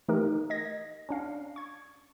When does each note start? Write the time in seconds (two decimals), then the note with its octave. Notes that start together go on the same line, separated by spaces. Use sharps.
0.08 E3 A3 D#4 G4 A#4
0.50 D#5 G#6 A#6
1.09 C#4 D4 F5
1.56 C#6 G#6